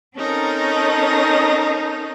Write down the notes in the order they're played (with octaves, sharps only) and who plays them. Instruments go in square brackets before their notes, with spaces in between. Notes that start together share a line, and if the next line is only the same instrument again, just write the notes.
[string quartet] C4 C#4 D#4 A4 A#4